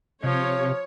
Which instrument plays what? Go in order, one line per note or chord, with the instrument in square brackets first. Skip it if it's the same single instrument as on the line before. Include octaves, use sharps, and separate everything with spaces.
[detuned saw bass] C3 [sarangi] F3 [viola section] C#5